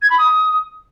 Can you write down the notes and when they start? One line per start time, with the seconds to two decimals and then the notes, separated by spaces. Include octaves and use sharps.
0.01 G#6
0.10 B5
0.18 D#6